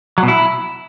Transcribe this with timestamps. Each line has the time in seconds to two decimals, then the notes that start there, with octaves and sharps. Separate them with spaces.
0.18 F#3
0.23 B2
0.28 E4